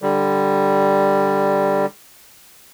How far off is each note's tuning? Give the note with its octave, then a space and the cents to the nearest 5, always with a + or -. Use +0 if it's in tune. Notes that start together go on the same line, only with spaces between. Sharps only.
D3 +0 G3 +0